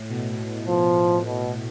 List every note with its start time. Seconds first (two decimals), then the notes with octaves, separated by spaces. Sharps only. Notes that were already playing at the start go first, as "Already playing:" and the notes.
Already playing: A2
0.09 B2
0.67 F3
1.26 B2